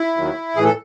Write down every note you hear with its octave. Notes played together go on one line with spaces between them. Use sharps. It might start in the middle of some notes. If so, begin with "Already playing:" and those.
Already playing: E4
D#2 D#3 F#3
A2 E3 G#4
A4